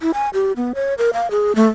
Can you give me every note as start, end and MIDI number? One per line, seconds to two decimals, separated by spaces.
0.01 0.11 64
0.14 0.29 80
0.34 0.52 67
0.56 0.73 59
0.75 0.94 73
0.98 1.11 70
1.13 1.30 77
1.31 1.55 68
1.55 1.68 57